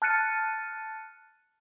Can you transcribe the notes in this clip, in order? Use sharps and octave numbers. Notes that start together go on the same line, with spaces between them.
A5 F6 F#6 A6 C#7 D#7